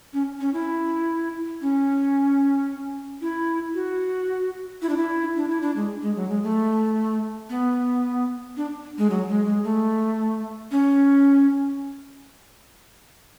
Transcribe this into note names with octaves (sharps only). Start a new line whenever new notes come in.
C#4
C#4
E4
C#4
E4
F#4
E4
D4
E4
D4
E4
D4
G#3
G#3
F#3
G#3
A3
B3
D4
G#3
F#3
G#3
G#3
A3
C#4